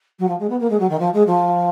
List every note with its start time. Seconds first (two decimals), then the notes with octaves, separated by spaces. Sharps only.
0.19 F#3
0.28 F3
0.40 G#3
0.50 B3
0.60 A#3
0.70 G#3
0.80 F#3
0.89 D#3
1.00 F3
1.14 G#3
1.27 F3